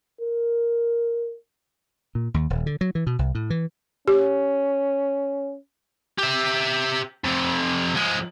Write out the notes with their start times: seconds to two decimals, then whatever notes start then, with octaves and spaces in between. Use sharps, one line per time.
0.21 A#4
2.15 A#2
2.34 D#2
2.50 D#1
2.66 D3
2.81 F#3
2.95 E3
3.07 B2
3.19 C2
3.35 A2
3.50 E3
4.08 C#4 G4
6.18 G4 E5
7.25 F2 C3
7.95 F3 G#3